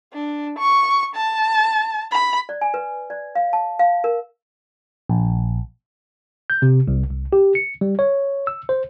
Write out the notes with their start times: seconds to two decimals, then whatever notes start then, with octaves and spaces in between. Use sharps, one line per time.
0.13 D4
0.59 C#6
1.16 A5
2.12 B5
2.49 D5
2.61 G#5
2.74 B4
3.10 D5
3.35 F5
3.53 A5
3.79 F5
4.04 A#4
5.09 A#1
6.50 G6
6.62 C3
6.88 C2
7.10 C2
7.33 G4
7.55 C#7
7.81 G3
7.99 C#5
8.47 E6
8.69 C5